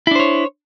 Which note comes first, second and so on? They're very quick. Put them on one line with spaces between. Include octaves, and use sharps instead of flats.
E4 D4 C5 C#5